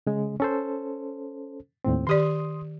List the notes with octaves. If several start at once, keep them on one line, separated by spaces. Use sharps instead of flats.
C#3 G#3
C#4 A4 C5
D#2 A2 C4
D#3 G4 D5 C6 D#6